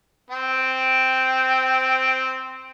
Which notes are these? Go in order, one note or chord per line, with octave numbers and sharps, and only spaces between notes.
C4 G5